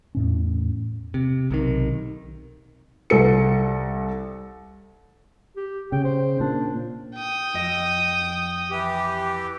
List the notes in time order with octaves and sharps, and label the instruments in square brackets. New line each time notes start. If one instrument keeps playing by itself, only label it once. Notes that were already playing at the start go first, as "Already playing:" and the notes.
[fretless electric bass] E2 A2 C#4
[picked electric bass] C3
B1 C3 D#3
[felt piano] C2 A4 C#7
[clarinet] G4
[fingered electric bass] C#3 [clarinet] G5
[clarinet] C5
[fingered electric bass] A#2 [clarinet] D4
[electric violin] G5 D#6
[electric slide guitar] F2 D#5
[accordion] E3 G4